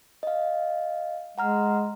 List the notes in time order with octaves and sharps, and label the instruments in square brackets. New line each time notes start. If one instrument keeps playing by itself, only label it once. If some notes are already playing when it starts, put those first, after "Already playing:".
[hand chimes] D#5 F5
[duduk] G#3 [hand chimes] F#5 A#5 F6